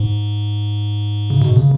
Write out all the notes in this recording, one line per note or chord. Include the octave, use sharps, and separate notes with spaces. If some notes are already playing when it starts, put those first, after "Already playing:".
Already playing: G#2
C#3
B2
C#3